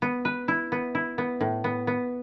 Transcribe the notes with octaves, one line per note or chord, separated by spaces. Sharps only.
B3
B4
E4
B3
E4
B3
A2
B3
B3